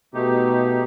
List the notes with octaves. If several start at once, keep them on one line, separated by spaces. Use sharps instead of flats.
B2 A3 D#4 G4